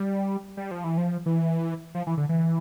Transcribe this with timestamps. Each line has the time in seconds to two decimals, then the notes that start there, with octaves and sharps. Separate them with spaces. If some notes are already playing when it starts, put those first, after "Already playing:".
Already playing: G3
0.57 G3
0.71 F3
0.84 E3
0.97 F3
1.26 E3
1.95 F3
2.07 E3
2.17 D3
2.29 E3